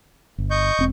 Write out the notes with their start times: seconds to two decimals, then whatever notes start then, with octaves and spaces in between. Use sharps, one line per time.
0.38 G1
0.51 D#5 C#6 G6
0.79 E1 C4